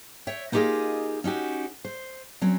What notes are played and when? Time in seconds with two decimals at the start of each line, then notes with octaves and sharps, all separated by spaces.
0.27 C#5 E5 G5
0.52 A#3 D#4 F4 G4 G#4 D#5
1.24 C#4 D#4 F#4 G4
1.85 C5
2.41 F#3 C4 C#4